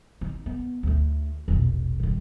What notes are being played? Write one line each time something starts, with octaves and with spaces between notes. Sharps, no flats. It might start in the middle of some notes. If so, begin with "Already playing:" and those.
D#4
B3
D2 A3
E1 A#1
G2 D#3